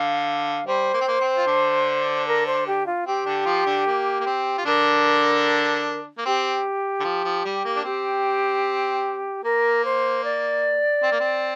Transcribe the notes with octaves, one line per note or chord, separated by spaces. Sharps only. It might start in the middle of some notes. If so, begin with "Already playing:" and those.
Already playing: D3 F5
G3 C5
A#3
C4
A#3
C4
F4
D3 D4
A#4
C5
G4
F4
C4 G4
D3 D4
F3 F4
D3 D4
A#3
A#3
C4
F4
D3 D4 A#4
A#3
C4 G4
D3
F3
F3
G3
A#3
D4
C4 G4
A#3 A#4
C5
D5
C4
A#3
C4